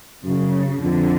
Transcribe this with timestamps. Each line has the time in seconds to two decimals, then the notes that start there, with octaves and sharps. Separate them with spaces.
0.24 F#2 C#3
0.79 F2 D3